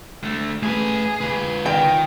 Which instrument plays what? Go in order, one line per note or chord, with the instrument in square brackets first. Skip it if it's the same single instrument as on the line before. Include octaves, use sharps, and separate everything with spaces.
[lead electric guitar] D3 A3
[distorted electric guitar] A3 B4 [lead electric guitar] G#4
[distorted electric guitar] F4 B4
[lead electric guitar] D#3 [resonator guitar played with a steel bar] G5